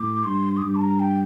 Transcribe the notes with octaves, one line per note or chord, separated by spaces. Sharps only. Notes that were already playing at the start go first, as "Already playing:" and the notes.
Already playing: A2 D6
G2 C6
D#6
G2 D6
A5
A#5
G5